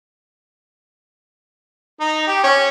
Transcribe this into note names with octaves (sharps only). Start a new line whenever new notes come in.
D#4
G4
C#4